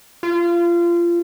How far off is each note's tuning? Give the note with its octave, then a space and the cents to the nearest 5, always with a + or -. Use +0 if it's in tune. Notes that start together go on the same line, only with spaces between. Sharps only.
F4 -25